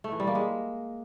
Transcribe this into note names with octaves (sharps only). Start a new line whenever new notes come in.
A3
E3
G3
A#3
G#3